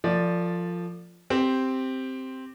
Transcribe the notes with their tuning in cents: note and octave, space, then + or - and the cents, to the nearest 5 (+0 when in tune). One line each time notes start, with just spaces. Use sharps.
F3 +0 A3 +40 D5 +0
C4 +0 G4 +0